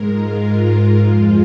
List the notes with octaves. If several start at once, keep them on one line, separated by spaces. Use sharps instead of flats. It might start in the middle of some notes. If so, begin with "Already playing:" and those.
Already playing: G#2 G#3 A#4
F4
F2 F3 G#3